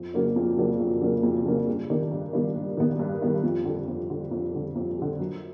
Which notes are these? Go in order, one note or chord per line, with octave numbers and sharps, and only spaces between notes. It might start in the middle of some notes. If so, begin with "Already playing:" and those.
Already playing: F2
C#3 F#3 A#3 D4
F2
C#3 F#3 A#3 D4
F2
C#3 F#3 A#3 D4
F2
C#3 F#3 A#3 D4
G2
D#3 G3 B3 D4
G2
D#3 G3 B3 D4
G2
D#3 G3 B3 D4
G2
D#3 G3 B3 D4
F2
D3 G3
F2
D3 G3
F2
D3 G3
F2
D3 G3
F#2